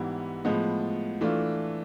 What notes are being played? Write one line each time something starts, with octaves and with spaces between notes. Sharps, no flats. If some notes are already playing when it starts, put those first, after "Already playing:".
Already playing: G#2 E3 G3 B3 E4
A2 F3 G#3 B3
E3 A3 D4 F4